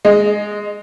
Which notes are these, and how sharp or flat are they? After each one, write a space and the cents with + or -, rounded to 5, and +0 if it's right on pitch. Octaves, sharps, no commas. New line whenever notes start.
G#3 +0 D#5 -20